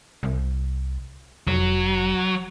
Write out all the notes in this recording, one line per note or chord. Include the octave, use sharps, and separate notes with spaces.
C2
F1 F#3